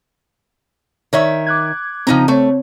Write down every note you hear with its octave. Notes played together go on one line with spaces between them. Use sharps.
D#3 C#5 E5
D6 F#6 G#6
C#3 F3 C4 D#4 A#5
A3 C4 C#5